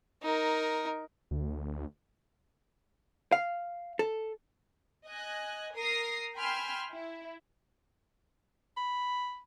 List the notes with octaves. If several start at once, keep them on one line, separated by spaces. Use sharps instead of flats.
D#4 A#4
D2
F5
A4
D#5 G#5 F#6
A#4 D#6 A#6 C7
G5 G#5 B5 C6 E6 F6
E4
B5